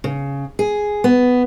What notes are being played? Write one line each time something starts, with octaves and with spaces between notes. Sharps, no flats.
C#3
G#4
B3